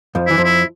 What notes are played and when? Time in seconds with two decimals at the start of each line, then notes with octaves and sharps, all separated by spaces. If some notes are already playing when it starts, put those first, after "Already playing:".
0.15 F2 F3
0.27 E3 E4
0.38 F2 F3
0.44 E4